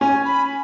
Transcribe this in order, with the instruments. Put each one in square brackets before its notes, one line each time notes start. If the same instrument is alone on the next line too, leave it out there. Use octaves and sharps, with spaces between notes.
[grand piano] C#4 [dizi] G#5
[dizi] B5